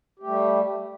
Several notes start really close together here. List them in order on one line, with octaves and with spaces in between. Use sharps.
G4 A3 G3